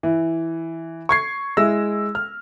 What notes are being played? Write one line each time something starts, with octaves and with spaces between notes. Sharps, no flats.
E3
C#6 G#6 C7
G#3 E4 E6 A#6
F6